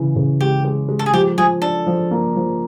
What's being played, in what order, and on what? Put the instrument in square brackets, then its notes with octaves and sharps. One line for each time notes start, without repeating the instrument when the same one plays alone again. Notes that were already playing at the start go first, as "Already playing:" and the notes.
Already playing: [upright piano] C#3 E3
C#3
[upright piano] G#3 [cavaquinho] G4
[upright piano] G#3
G#3
[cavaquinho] A4
G#4
[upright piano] F3 [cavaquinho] G4
[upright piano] F3 [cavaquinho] G#4
[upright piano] D4 [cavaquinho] A4
[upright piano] F3
A#3
F3